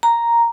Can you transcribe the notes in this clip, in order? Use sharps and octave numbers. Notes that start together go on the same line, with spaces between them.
A#5